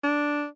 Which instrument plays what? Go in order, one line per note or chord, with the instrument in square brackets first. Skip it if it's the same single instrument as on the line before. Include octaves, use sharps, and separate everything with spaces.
[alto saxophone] D4